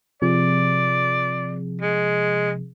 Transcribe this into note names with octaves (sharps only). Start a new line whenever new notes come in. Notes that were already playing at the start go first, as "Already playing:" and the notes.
C3 F3 G#4 D5
G#3